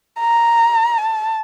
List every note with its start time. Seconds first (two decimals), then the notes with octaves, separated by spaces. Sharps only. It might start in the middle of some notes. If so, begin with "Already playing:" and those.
0.20 A#5
0.98 A5